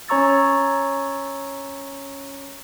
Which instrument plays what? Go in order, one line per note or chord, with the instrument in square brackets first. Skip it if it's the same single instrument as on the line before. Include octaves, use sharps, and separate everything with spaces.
[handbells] C#4 C#5 A#5 C#6 E6 A6